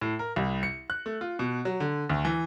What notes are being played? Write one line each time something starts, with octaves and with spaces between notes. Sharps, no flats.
A2
A#4
C2
C#7
F#6
A3
F4
B2
F#3
D3
D2
E3